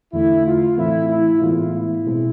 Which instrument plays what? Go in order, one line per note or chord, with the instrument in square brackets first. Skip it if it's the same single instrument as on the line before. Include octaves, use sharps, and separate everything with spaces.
[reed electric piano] E2 D3 A3 [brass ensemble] E4
[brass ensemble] F4
[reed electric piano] A2 E3 A3 C4 [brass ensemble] E4
[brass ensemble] E4
[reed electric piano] A2 E3 G#3 B3 [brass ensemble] F4
[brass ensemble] E4
[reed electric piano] B2 G#3 C4